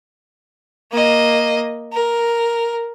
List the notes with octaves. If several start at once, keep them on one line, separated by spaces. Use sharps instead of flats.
A#3 D#5
A#4